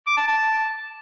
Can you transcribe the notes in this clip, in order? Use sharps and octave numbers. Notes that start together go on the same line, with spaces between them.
D6
A5
A5